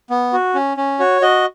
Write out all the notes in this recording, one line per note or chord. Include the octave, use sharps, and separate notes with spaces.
B3
F#4
C#4
C#4
F#4 C#5
F#4 D#5